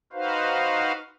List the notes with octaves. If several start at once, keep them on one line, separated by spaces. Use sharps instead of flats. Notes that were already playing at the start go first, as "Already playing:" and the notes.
D#4 F#4 B4 C5 F5